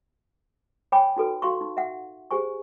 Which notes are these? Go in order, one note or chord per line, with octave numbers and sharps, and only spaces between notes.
C#5 G5 G#5 B5 D6
D#4 F#4 A4 B4
F#4 F5 C6 C#6
D#4
E5 F#5
G4 G#4 C5 G#5 C#6